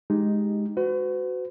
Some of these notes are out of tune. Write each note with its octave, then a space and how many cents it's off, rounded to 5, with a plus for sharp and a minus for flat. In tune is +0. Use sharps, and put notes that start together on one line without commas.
G#3 +5 D#4 +0 G4 +0
F#4 +5 B4 +45